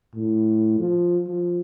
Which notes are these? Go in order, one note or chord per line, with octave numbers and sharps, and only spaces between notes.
A2
F3
F3